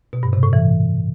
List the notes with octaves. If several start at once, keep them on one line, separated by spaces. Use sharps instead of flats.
B2
G2
C3
A2
E3